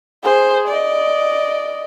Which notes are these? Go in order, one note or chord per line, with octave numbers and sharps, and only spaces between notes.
G#4 C5
D5 D#5